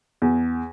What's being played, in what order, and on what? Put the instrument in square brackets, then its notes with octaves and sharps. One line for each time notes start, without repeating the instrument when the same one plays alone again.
[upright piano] E2